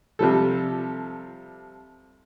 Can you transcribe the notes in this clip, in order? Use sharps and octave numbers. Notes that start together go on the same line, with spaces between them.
C3 F3 G3 A4